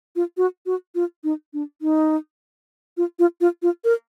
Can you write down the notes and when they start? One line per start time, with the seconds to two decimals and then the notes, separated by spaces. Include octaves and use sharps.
0.16 F4
0.37 F#4
0.66 F#4
0.95 F4
1.24 D#4
1.53 D4
1.82 D#4
2.97 F4
3.19 F4
3.41 F4
3.62 F4
3.84 A#4